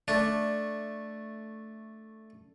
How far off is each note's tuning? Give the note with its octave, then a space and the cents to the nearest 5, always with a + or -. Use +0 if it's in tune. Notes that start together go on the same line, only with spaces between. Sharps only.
A3 +0 D4 +0